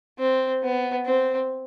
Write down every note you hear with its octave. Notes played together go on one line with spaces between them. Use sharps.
C4
B3
C4